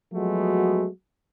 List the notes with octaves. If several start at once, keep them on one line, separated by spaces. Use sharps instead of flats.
F3 F#3 G#3 A3 B3 F#4